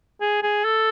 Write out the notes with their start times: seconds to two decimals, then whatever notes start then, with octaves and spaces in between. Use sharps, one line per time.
0.21 G#4
0.43 G#4
0.64 A4